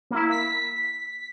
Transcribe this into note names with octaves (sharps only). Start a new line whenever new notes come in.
A#3 E4
B6